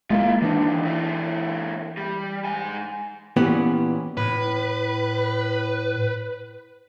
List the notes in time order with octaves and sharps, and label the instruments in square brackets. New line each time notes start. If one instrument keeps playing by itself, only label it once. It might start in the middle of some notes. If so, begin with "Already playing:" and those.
[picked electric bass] G#3 A#3 [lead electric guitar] E4 F4
[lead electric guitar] D2 D#3 [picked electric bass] E3 D4
[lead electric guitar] A#2 E4
G3
G#2 G#5
[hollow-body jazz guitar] A#2 E3 B3 C#4 G4
[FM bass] A2 [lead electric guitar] B4